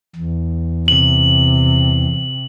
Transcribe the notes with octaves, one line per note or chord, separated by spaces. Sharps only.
E2
C3 F#7